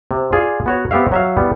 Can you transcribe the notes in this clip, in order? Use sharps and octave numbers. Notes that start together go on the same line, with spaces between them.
C3
F4 G#4 D5
B3 F#4 C#5
B3 C4 G4 E5 F5
F#3 E5 F5
G3 B3 E4